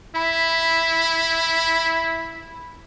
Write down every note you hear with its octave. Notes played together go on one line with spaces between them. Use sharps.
E4 B5